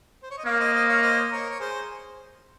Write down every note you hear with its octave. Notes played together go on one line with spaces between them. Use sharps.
C5
C#5
D#5
A#3 C#5 F5
C5 D#5
C5 D#5
C#5 F5
C5 D#5
A#4 C#5
C#5
G#4 C5